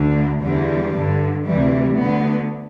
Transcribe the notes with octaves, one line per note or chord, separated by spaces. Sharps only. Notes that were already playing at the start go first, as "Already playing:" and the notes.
Already playing: D2 D3
E2 D3 G3
G2 D3
D2 C3 E3 G3
D2 D3 B3